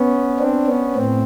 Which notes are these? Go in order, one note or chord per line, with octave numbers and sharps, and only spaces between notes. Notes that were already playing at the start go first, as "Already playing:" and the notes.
Already playing: B3 C#4
C4 D4
B3 C#4
A2 C4